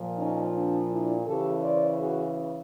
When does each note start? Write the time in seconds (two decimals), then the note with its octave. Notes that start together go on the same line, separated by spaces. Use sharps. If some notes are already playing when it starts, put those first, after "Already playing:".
Already playing: A#2 F3
0.17 C#4 D#4
0.53 C4 D4
0.89 D4 E4
1.25 C#3 E3 G4 A4
1.62 C5 D5
1.98 F#4 G#4